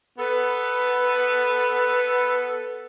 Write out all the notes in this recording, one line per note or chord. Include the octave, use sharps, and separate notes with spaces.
B3 A4 B4